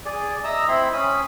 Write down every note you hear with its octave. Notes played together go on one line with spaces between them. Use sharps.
G#4 D5
D#5 E5 A#5 E6
C4 E4 B5 C6
C#4 B5 D#6